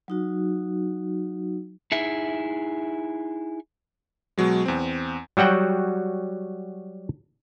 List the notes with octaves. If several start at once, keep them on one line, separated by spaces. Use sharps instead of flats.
F#3 D#4 F#4
D#4 E4 G#4 E5
B2 F#3 G#3
E2 C4
F#3 G3 F#4 F#5 G5